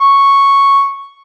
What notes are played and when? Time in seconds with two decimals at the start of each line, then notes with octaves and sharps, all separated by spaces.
0.01 C#6